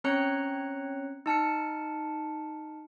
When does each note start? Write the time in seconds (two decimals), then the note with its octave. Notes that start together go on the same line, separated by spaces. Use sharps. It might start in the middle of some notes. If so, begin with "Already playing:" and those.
0.04 C4 C#4 C#5 A#5 F#6 C#7
1.26 D#4 A5 F6 C#7